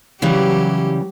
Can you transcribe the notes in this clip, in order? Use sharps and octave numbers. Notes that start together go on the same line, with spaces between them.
C#3 E3 F#3 G3 G4